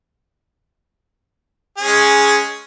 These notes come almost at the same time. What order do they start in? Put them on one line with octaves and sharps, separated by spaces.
G#4 C#4 G#3